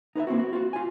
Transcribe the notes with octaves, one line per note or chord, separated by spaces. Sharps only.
D#4 B4 D5 E5
A#3 C4 E4 F#4
F#4
F4 F#4
F4 G#5